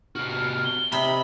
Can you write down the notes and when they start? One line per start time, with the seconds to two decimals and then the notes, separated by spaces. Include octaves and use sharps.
0.16 C3 F#4 F6
0.65 G7
0.92 C3 D#5 B5